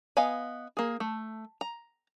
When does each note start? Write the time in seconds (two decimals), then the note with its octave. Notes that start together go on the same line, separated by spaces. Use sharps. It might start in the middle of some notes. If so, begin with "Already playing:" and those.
0.17 B3 D#5 F5 G#5 B5
0.77 A#3 G#4
1.00 A3
1.61 A#5